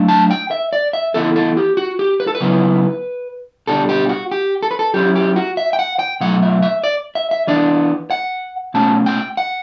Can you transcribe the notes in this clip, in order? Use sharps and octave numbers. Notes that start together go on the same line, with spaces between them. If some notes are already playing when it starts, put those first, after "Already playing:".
Already playing: F#3 A3 D4
A5
G5
E5
D5
E5
E3 B3 E4 A4
A4
G4
F#4
G4
B4
A4
B4
C#3 F#3 B3 E4
B2 G3 D4 A4
G4
F#4
G4
A4
B4
A4
F#3 C#4 E4 G4
G4
F#4
E5
G5
F#5
G5
B2 F#3 A3 F#5
E5
E5
D5
E5
E5
E3 B3 D4 D5
F#5
B2 A3 C#4 A5
G5
F#5